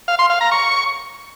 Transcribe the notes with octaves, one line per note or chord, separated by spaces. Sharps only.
F5
C6
F5
A#5
C#6